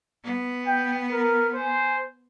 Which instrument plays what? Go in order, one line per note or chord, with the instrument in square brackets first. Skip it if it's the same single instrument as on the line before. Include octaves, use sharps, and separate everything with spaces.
[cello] B3
[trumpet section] G5
A#4
C5 G#5